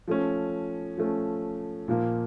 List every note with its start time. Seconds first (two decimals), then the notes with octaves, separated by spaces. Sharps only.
0.08 F3 A3 C#4
0.98 F3 A3 C#4
1.88 A#2 F3 A#3